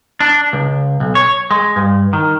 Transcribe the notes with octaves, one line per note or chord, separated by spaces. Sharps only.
D4
C#2
B1
C#5
G#3
G2
D#3